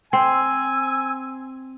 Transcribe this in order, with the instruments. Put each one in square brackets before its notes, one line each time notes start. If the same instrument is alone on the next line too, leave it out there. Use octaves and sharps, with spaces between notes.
[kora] C4 [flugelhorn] G#5 [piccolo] E6